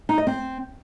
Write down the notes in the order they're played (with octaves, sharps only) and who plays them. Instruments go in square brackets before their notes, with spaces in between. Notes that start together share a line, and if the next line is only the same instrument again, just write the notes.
[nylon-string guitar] D#4
D#5
C4